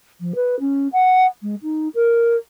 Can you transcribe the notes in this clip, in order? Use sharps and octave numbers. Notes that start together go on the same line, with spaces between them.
F3
B4
C#4
F#5
G#3
D#4
A#4